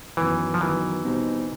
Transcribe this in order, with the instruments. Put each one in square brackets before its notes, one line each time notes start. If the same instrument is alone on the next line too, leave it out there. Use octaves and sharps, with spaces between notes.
[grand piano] F#2 D#3 F#3 B3 [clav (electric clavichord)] E3
[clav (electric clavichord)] F3
[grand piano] F#2 D#3 F#3 B3 [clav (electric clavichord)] E3
[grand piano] B2 G3 C4 D#4 F#4